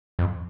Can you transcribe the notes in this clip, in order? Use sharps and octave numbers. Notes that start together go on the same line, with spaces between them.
F2